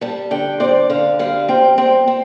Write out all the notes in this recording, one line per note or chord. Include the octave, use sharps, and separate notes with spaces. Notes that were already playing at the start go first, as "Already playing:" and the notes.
G3 A5
D3 G5
C4 D5
D3 F5
G3 F5
C4 G5
C4 G5
C4